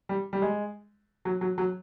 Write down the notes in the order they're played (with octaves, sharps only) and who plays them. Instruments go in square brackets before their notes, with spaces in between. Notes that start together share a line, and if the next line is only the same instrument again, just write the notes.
[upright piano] G3
G3
G#3
F#3
F#3
F#3